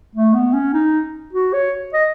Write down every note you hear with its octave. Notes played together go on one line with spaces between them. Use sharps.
A3
B3
C#4
D#4
F#4
C#5
D#5